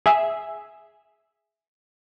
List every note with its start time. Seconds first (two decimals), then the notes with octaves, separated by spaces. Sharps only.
0.06 G#4 E5